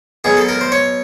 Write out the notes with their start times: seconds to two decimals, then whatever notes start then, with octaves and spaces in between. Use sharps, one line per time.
0.24 B2 F#3 G#4
0.37 A4
0.49 A#4
0.61 C5
0.72 C#5